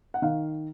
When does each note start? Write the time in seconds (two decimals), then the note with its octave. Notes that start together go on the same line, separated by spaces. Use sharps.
0.14 F#5
0.22 D#3 F5